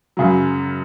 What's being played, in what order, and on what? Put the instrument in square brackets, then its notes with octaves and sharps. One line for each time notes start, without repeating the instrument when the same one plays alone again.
[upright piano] F#2 C#3 F#3